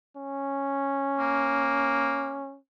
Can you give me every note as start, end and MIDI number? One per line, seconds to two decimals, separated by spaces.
0.16 2.58 61
1.19 2.39 58